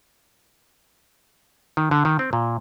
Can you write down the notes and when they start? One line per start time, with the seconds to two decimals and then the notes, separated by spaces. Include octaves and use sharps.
1.77 D#3
1.91 D3
2.05 D#3
2.19 C4
2.33 A#2